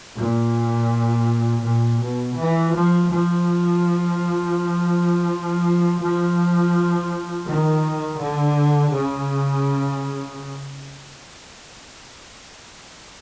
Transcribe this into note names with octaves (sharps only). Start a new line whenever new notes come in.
A#2
A#2
B2
E3
F3
F3
F3
D#3
D3
C#3